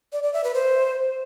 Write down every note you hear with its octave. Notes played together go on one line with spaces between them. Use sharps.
D5
D5
E5
B4
C5